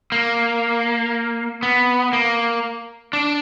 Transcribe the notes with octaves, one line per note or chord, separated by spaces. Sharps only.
A#3
B3
A#3
D4